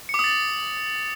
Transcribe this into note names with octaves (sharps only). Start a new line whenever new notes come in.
C#7
D6
D#6
A6